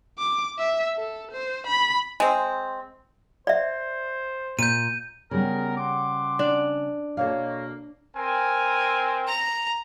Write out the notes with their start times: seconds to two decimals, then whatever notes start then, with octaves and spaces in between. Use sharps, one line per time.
0.19 D6
0.59 E5
0.98 A4
1.32 C5
1.67 B5
2.20 G#3 C4
3.47 C5 D5 E5
4.59 A#2 G6 D#7
5.31 C#3 G3 B3 A#4
5.78 F#5 C6 D6
6.39 D4
7.17 B2 A#3 A4 C#5 F5
8.17 C4 A#4 G#5
9.27 A#5